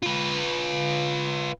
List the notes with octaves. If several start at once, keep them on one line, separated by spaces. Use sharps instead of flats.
F4 B4